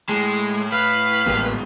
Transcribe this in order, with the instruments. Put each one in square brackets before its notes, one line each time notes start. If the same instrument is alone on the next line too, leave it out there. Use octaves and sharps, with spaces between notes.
[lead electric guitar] A2 A5 [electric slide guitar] G#3
[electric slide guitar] B4 [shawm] F5
[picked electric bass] A1 G3 A#3 [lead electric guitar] G#2 B2